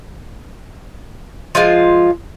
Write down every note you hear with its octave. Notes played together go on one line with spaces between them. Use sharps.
F3 G#3 F4